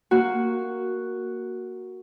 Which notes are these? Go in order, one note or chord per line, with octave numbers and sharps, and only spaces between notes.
A#3 F#4